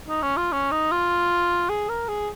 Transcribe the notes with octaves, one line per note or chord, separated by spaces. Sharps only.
D#4
C#4
F4
C#4
D#4
F4
G#4
A#4
G#4